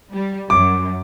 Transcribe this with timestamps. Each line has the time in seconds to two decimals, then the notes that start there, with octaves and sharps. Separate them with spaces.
0.13 G3
0.50 F#2 D6